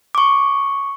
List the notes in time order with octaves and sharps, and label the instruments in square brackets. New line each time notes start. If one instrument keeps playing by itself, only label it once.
[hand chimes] C#6 D6